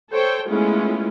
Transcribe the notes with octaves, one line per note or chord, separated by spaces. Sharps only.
A4 C5 C#5 G5
G#3 A3 B3 C#4 E4 F4